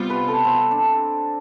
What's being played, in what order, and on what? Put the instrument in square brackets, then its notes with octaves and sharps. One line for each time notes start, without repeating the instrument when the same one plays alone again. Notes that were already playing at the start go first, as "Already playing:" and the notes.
Already playing: [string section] C3 G3 B3 F4
[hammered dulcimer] B4
A4
C4
D4